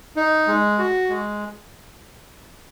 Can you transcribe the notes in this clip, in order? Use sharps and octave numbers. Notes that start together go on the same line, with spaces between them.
D#4
G#3
F#4
G#3